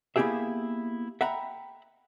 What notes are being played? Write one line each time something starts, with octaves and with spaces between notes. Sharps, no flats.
A#3 B3 E4 G4 G#4 E5
E5 F#5 G5 A#5 B5